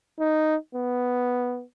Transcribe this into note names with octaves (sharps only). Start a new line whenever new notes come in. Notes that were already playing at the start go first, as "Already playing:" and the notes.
D#4
B3